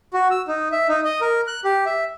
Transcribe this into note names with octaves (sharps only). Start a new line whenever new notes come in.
F#4
E6
D#4
E5
D#4
D#5
A#4
F#6
G4
E5